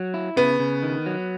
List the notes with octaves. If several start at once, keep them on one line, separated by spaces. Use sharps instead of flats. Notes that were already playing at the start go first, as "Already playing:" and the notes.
Already playing: F#3
E4
C#3 B3
C#3
D#3
F#3